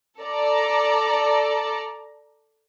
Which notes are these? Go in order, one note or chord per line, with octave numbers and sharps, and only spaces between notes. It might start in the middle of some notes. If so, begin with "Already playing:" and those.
A4 D5 A#5